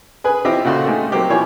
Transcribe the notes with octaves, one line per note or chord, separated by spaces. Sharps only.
G#4 B4 G#5
E3 C4 F4 G4 D#5 E5
A#2 C#3 F#4 A4 C6
G#3 A3 D#4 G4
F#3 A#3 C4 G4
B2 F3 E4 C#5 G#5